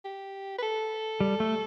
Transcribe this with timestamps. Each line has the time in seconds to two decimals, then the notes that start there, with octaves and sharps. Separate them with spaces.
0.05 G4
0.58 B4
0.62 A4
1.20 G3
1.40 A3